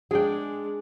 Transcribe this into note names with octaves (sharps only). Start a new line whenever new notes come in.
G#3 D4 G#4 G5